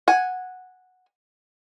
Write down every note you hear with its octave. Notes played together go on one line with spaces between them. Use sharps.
F#5 G#5